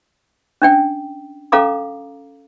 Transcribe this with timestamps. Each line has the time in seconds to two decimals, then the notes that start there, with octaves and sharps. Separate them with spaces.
0.62 C#4 D4 G5
1.52 C#4 A4 F5 A#5 D6 D#6